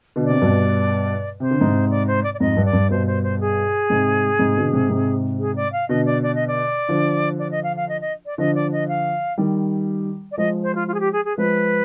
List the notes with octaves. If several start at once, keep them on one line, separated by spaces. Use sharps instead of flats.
B2 D3
C3 D5
G2 B2
C3 C5
D3
G#2 C3
D5
C5
D5
D5
F2 G#2 D#5
G2
D5
G2
G2 B2 C5
C5
C5
G#4
G#2 C3
G#2 C3
B2 D3
G#2 C3
G#2 C3
G#4
D5
F5
B2 D3 D#5
D5
D5
D#5
D5
D3 F3
D5
D#5
F5
F5
D#5
D#5
D5
D3 F3 D#5
D5
D#5
F5
D#3 G3
D5
F3 G#3 D#5
C5
F4
F4
G#4
G4
G#4
G#4
F3 G#3 B4